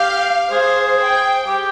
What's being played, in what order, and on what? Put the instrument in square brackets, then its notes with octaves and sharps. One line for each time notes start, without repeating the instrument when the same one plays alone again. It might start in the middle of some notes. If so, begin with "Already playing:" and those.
Already playing: [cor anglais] G4 [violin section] F5
[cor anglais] G#4 [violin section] C5
[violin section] G5
[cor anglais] G4